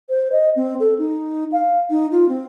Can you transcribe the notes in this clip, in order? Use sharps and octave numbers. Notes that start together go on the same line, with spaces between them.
C5
D#5
C4
A4
D#4
F5
D#4
F4
C4